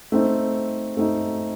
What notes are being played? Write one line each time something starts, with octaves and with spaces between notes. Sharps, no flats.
A3 C4 D#4
A3 C4 D#4